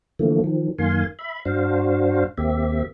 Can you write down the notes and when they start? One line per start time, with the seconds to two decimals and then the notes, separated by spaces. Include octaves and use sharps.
0.19 D3 E3 F3 A3 A#3
0.44 D#3 F3
0.78 F#2 D#3 A#3 F5 G#5 C6
1.19 E5 B5
1.45 G2 D4 F#4 C5 F5
2.38 D#2 A#3 C4 G4 E5